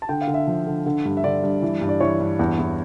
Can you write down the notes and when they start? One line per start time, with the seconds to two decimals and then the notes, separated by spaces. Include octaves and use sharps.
0.02 A5
0.09 D3 G5
0.21 F5
0.27 D3
0.34 E5
0.47 F3
0.67 D3
0.86 D3
1.05 G2
1.17 E5
1.24 D3 D5
1.43 G2
1.62 E3
1.81 G2
1.89 D5
2.00 E3 C#5
2.20 G2
2.39 E2
2.59 E2